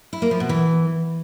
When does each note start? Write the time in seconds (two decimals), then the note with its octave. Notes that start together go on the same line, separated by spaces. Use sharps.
0.13 E4
0.22 A#3
0.31 F3
0.40 B2
0.49 E3